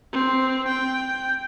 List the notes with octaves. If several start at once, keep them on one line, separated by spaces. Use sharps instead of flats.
C4
G5